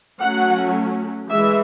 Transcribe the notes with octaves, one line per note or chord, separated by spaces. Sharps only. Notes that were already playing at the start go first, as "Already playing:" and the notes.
F#3 A3 C#4 F#5
E3 G#3 E5